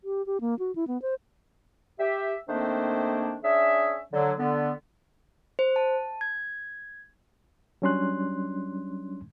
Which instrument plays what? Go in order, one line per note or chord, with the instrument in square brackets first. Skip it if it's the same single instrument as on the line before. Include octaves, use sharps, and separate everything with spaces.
[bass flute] G4
G4
A#3
F#4
E4
B3
C5
[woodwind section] G4 E5
D#3 A3 A#3 C4 D4 C5
C#4 D4 G#4 E5
D3 F#3
D3 B3
[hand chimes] C5
A5
G#6
[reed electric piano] F#3 G3 C#4 D4 C6 F#6